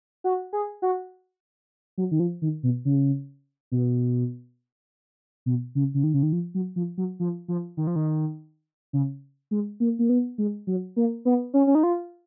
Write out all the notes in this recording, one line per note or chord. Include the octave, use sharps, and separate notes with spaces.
F#4
G#4
F#4
F#3
D#3
F3
D#3
B2
C#3
B2
B2
C#3
C#3
D#3
C#3
D#3
F3
F#3
F3
F#3
F3
F3
D#3
F3
D#3
C#3
G#3
A#3
A#3
B3
G#3
F#3
A#3
B3
C#4
C#4
D#4
F4